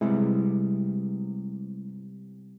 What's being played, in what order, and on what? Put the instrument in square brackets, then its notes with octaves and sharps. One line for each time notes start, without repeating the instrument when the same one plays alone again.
[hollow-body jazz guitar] C3 G3 B3 [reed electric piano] G#3 E4